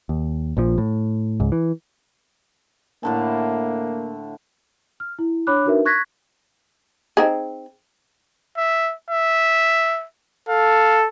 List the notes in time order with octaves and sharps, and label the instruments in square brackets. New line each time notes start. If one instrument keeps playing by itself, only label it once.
[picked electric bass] D#2
A#1 A#2 F3
A2
C#2 G#2
E3
[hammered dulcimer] A2 D3 A5 [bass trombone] A#3
[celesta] F6
E4
D4 C#5 B5 D6 F#6
D4 D#4 F#4 A#4 B4 E5
C#6 F#6 G#6 A#6 B6
[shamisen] C4 D#4 G#4
[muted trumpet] E5
E5
[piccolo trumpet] A4 [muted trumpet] F5